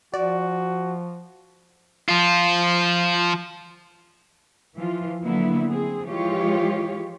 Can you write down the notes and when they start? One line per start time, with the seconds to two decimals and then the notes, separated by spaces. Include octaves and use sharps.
0.14 F3 F#4 D5
2.09 F3 F4
4.76 E3 F3 F4
5.24 D3 F#3 A#3 B3 E4
5.69 C4 G#4
6.04 E3 F3 G#3 F4 G4 C#5